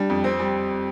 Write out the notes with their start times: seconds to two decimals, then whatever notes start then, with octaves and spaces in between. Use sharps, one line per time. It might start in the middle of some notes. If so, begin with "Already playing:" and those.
Already playing: G3 D4
0.10 F2
0.24 C4
0.39 G3